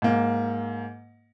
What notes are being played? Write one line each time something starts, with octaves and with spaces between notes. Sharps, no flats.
G#2 A#3